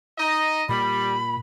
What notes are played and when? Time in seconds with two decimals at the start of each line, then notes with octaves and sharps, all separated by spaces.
0.18 D#4 D#5
0.69 A#2 G3 B5